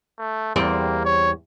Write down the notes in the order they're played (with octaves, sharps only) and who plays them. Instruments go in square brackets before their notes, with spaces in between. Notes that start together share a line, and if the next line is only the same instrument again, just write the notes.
[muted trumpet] A3
[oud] E2 G3 C4 [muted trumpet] A#3
[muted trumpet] C#5